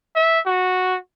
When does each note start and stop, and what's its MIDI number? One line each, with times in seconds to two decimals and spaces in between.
0.15 0.40 76
0.46 0.97 66